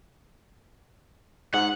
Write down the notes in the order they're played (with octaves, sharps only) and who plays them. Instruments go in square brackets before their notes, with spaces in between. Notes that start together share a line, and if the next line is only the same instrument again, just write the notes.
[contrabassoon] G#2 [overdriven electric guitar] F#5